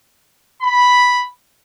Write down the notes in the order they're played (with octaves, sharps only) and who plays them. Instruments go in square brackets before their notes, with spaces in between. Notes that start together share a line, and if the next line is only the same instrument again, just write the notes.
[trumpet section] B5